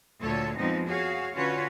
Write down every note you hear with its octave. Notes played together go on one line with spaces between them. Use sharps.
D2 A#2 D3 A3 A4 C#5
F2 F3 G#3 B3 C4 D#4
F#4 G#4 C#5 F5
D3 C#4 F4 F#4 B4 C#5